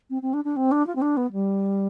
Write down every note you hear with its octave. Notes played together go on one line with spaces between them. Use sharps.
C4
C4
D4
D4
C4
D4
F4
C4
D4
B3
G3